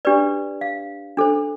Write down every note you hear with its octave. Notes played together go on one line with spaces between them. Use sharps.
D4 G4 B4 D5
F5
D4 A4 C5